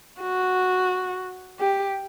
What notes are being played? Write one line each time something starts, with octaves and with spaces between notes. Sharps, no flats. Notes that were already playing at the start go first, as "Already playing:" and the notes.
F#4
G4